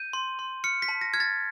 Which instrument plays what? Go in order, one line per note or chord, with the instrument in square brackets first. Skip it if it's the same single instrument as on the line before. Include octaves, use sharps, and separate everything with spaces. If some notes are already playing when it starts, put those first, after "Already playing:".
Already playing: [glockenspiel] G6 D#7
C6
C6
F6 C#7
B6
A5
A#6
F6 G#6
A6